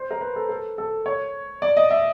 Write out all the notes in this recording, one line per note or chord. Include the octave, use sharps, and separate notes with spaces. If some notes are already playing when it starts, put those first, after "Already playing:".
Already playing: C5
A#4
B4
A4
A4
A4
C#5
D5
D#5
E5